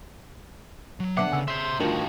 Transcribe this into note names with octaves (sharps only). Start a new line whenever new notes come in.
F#3
D3 B3 D4 E5 F#5 D6 C7
C#3 G#5 E6
C#3 C5 E5 C6
D2 G2 D#3 F3 D4 F4 F#4 A#4